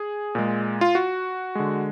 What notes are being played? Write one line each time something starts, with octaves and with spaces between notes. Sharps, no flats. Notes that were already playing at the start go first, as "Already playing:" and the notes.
Already playing: G#4
A#2 G#3
F4
F#4
D3 G#3